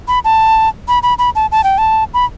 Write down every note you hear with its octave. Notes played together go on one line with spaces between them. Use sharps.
B5
A5
B5
B5
B5
A5
A5
G5
A5
B5